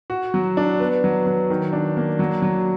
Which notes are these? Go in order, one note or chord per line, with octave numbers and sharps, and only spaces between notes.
F#4
F#3
D4
B3
F#3
F#3
D#3
D4
A#3
F#3
F#3